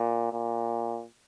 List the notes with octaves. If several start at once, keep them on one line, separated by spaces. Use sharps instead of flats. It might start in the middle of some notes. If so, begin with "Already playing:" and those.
Already playing: A#2
A#2